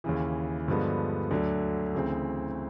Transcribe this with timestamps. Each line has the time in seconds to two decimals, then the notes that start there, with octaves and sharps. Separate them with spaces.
0.04 D#2 C#3 E3
0.68 G2 D3 F3 G#3 B3
1.31 D2 D3 F#3
1.95 D2 C#3 E3 A3 C4